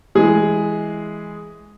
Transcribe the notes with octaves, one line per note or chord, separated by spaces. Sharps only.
E3 G#3 G#4